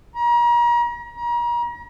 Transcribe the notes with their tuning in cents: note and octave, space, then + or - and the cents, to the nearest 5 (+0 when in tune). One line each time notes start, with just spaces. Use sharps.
A#5 +40
A#5 +40